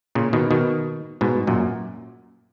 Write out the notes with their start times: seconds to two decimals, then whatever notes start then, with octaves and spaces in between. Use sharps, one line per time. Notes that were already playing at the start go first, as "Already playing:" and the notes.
0.15 A#2 C#3
0.33 B2 D#3
0.51 B2 D#3
1.21 G#2 B2
1.47 F#2 A#2